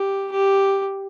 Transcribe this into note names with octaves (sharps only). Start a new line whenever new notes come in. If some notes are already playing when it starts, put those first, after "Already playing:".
Already playing: G4
G4